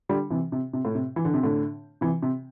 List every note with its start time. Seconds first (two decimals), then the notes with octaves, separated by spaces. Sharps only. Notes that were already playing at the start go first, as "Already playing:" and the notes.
0.09 D3 G3
0.30 C3 E3
0.52 C3
0.73 C3
0.85 A2
0.95 C3
1.16 E3
1.25 D3
1.34 C3
1.43 A2 D3
2.01 C3 E3
2.22 C3